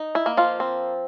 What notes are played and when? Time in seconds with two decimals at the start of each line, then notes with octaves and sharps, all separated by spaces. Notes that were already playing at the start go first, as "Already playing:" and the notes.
Already playing: D#4
0.15 E4
0.26 A#3
0.37 F3 F4
0.60 C4